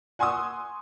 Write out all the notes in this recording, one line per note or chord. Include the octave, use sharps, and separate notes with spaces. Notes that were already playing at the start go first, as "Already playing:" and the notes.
F#5 G#5 C6 C#6 D#6 E6